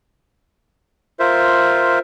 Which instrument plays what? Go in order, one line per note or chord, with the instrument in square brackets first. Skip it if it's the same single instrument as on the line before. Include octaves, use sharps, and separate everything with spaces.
[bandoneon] F4 A#4 C5 E5